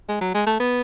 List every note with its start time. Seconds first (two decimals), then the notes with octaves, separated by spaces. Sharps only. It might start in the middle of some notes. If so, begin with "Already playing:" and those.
0.09 G#3
0.21 F#3
0.34 G#3
0.46 A3
0.60 B3